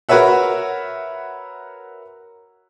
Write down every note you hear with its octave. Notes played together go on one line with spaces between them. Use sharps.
F#4 A#4 B4 C#5 E5 F#5